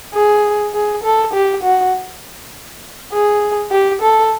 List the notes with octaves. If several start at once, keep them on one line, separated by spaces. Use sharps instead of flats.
G#4
G#4
A4
G4
F#4
G#4
G4
A4